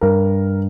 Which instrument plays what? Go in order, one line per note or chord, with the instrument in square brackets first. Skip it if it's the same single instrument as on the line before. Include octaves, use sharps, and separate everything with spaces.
[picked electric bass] G2 [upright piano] A#4